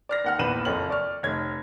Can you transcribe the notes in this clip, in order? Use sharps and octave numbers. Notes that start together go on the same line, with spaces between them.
D5 F6 A#6
D#2 F#5 F6
A#1 E2 B4 D#7 E7 F#7
F#1 F2 C#5 F6 F#7
D5 C#6 F6
F1 C#5 G#6